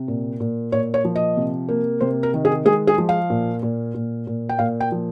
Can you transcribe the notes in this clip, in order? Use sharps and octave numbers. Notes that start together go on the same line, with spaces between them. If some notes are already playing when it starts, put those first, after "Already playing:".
Already playing: C3
A#2
A#2
A#2 C#5
C#5
F3
D#5
C3
A#3
C3 C5
A#4
D#3
G#4
G#3 G#4
G#4
F3
F5
A#2
A#2
A#2
A#2
G5
A#2 F5
G5
F3